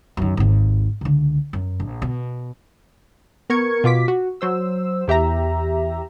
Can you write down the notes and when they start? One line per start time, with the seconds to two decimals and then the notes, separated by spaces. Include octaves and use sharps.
0.17 F#2 D#3
0.37 G#1 D#2
1.01 C#2 D3
1.53 F#2
1.80 A#1
2.02 B2
3.50 B3 A#4 C#6 G#6 C#7
3.84 B2 F4 D6 B6
4.08 F#4
4.41 F#3 C5 E6
5.08 E2 G4 E5 A#5